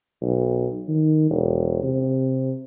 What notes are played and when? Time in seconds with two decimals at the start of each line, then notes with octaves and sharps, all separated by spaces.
0.22 B1
0.88 D#3
1.30 E1
1.83 C3